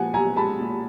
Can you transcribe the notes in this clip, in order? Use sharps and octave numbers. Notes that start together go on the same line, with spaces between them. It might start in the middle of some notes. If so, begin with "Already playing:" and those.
Already playing: A#2 F3 G#3 F#5 G#5
B1 G#5 A#5
G#3 A5 B5
A#2